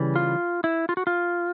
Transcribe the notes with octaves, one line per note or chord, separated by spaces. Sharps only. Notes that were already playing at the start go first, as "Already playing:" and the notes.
Already playing: C#3 E3 G3
F4
E4
F4
F#4
F4